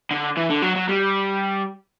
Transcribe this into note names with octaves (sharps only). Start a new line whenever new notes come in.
D3
E3
D3
F#3
F#3
G3